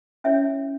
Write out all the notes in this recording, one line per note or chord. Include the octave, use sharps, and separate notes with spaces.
C#4 E4 C#5 E5